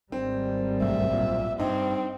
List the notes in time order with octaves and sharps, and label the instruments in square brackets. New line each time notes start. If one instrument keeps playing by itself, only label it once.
[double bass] G#1 G3 [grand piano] C4
[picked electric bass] B1 G2 A3 [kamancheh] E5
[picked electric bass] B1 A#2
[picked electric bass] G2 [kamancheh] C4 [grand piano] D#4